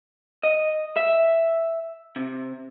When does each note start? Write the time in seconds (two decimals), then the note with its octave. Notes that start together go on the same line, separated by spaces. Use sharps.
0.43 D#5
0.96 E5
2.16 C3